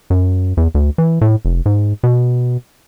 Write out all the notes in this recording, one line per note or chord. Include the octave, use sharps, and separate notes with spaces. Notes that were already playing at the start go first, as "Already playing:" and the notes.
F#2
E2
D2
E3
A2
F1
G#2
B2